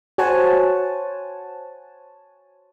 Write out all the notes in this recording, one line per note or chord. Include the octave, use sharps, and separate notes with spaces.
F#4 C5 C#5 F#5 G#5 A5